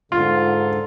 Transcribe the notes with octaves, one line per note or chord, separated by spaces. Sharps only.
G#2 D3 F4